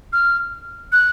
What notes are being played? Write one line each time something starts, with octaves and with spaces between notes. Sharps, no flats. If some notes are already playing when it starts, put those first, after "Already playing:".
F6
F#6